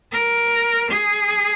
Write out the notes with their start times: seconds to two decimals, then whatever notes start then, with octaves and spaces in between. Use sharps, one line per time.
0.12 A#4
0.91 G#4